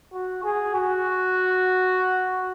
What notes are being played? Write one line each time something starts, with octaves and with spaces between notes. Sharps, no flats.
F#4
G#4
F#4